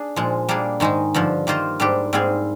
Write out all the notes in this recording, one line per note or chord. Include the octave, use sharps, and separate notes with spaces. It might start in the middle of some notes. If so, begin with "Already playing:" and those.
Already playing: D4 G#4
A#2 F3 G#3
G3 A#3 D4 G#4
G#2 D#3 G#3 D#4
G2 D3 F3
D#3 A#3 F4 C5 D#5
G#2 G3 D4 G4
G#2 G3 C4 F4 G#4